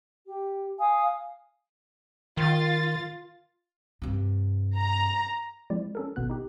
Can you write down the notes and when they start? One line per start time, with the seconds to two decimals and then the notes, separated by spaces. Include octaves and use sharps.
0.25 G4
0.79 F5 G#5 D#6
2.37 D#3 F4 A6
4.02 G2 C3
4.77 A#5
5.70 F3 G#3 C4 E4 D5
5.95 C#4 A4 A#4
6.16 G#1 B2 B3 F#6
6.30 D#4 G4